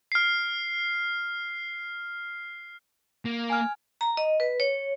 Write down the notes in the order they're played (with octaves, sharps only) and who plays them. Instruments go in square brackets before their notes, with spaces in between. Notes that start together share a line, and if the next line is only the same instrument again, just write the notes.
[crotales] F6 C7
[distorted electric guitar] A#3
[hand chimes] G#5 F6
[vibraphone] A#5
D#5
B4
C#5